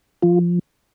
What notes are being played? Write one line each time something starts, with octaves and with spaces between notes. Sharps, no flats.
F3 F4